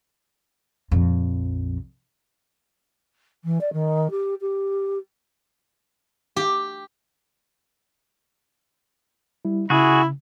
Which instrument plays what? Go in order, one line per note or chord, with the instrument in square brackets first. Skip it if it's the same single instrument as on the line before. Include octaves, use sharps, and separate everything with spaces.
[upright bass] A#1 F2
[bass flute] E3
D5
D#3
G4
G4
[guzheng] G4
[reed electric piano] G3 E4
[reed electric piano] C#3 [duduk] E4 [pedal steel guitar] F#4 G#4